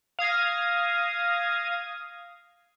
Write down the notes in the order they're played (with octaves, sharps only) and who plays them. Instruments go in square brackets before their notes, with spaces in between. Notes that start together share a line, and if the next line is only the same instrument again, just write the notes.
[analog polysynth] F5 D#6 G#6 A#6